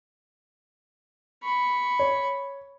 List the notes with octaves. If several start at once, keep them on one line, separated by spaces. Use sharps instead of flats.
B5 C#6
C#5